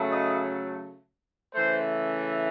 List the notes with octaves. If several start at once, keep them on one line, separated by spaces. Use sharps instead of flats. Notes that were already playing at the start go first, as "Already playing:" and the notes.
Already playing: C#3 F#3 A3
D#5
C#3 E3 A3 C5